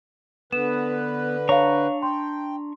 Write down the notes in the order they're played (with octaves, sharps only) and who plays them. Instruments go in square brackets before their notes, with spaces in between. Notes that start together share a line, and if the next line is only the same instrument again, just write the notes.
[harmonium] D3 B4 [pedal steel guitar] B3 [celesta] E7
[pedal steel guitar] D4 A#5 C#6 [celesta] C#5 F5
[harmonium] G5 [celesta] C6